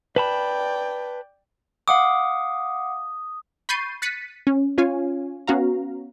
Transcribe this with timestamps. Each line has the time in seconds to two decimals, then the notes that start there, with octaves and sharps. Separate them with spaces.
0.16 B4 D5 G5 A5 B5
1.88 F5 F#5 D6 D#6
3.69 B5 C#6 G6 A6 C7 D#7
4.02 F#6 A6 B6 C#7 D#7
4.47 C#4
4.78 C#4 F4 C#5 F5 G#5
5.47 B3 C#4 F#4 F5 A#5